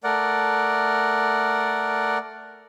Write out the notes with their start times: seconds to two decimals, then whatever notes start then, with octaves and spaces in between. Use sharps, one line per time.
0.04 A3 A#4 D5 F#5